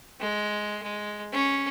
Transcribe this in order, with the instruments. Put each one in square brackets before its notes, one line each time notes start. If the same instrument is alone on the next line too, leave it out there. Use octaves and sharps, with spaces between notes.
[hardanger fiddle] G#3
G#3
C#4